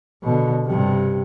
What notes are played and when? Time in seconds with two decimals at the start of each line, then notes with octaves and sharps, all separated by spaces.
0.23 B2 D3
0.66 G2 C3